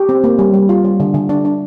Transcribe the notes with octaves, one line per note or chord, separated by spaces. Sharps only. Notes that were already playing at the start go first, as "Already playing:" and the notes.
Already playing: G4
C4
A#3
G3
G3
F4
G3
D3
D3
D4
D4